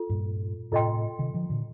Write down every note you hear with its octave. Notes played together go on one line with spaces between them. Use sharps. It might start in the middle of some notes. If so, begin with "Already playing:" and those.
Already playing: F4 A4
G2 A#2
A2 C3 F4 A4 D#5 G5 C6
C3 D#3
D3 F3
A#2 D3